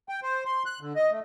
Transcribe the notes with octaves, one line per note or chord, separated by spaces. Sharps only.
G5
C5
C6
F#6
D3
D#5
A3